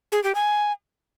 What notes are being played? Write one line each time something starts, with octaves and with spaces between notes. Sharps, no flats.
G#4
G4
G#5